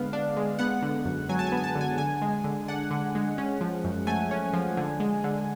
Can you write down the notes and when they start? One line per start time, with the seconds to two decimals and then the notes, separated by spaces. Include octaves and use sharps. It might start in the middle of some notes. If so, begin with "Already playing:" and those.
Already playing: D3 G#3 B3 F5
0.13 D4
0.37 G#3
0.59 B3 F#5
0.82 D3
1.05 F#2
1.29 F#3 G#5
1.39 A5
1.47 G#5
1.52 B3
1.57 G#5
1.64 A5
1.75 D3
1.81 G#5
1.98 D3 G#5
2.22 G#3
2.44 D3
2.68 D4 F#5
2.91 D3
3.15 G#3
3.38 C#4
3.61 F3
3.84 F#2
4.07 A3 G#5
4.31 C#4
4.53 F3
4.77 D3
5.00 G#3
5.24 D3